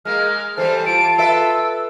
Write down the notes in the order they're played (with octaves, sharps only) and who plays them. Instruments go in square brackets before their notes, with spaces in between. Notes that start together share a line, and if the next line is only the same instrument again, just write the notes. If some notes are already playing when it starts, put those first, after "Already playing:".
[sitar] G#3 A#3 [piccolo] F6
[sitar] E3 G3 [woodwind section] A4 C5
[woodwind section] F4 A5 [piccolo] D7
[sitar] A4 B4 E5 [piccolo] E6